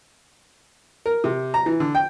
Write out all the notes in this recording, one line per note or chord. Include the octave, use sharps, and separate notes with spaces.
A#4
C3
A#5
E3
D3
G5